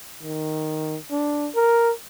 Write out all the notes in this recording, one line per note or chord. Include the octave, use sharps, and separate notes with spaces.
D#3
D4
A#4